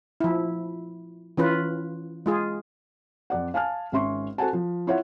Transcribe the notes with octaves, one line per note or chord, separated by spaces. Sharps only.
F3 E4
E3 C#4 F4 B4
G#3 F4 G#4
F2 D5 F#5
F5 G#5 A5 F6
G#1 C#4 E5 C6 C#6
F#4 A4 C5 F#5 G#5 A5
F3
E4 F4 C#5 E5 F#5